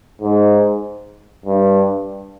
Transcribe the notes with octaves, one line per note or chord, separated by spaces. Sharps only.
G#2
G2